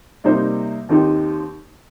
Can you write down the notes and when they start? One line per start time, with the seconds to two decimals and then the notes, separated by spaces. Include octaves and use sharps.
0.24 C3 G3 A#3 D#4 C5
0.89 D#2 D#3 C4 D#4 G4